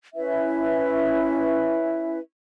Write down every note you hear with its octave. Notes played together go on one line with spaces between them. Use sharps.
C#4 E4 B4 E5